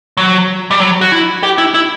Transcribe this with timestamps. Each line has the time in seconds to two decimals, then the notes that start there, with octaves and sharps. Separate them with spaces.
0.17 F#3
0.71 G3
0.80 F#3
1.01 F#4
1.12 E4
1.43 G4
1.58 E4
1.74 E4